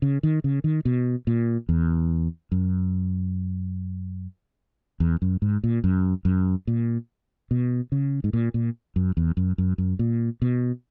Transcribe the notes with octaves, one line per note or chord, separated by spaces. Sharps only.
C#3
D#3
C#3
D#3
B2
A#2
E2
F#2
E2
F#2
G#2
A#2
F#2
F#2
A#2
B2
C#3
G#2
A#2
A#2
F#2
E2
F#2
F#2
F#2
A#2
B2